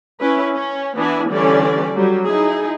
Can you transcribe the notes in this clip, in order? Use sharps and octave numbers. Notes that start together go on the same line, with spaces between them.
C#4 E4 B4
C#4
E3 B3 D4 E4 G#5
D3 E3 G3 C#4 D5
F#3 G3
D#4 E4 G#4